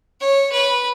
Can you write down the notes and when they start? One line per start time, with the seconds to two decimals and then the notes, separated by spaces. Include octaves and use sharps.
0.20 C#5
0.52 B4